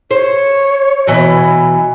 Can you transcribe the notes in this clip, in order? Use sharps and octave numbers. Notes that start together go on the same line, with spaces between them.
C5 C#5
B2 E3 F#3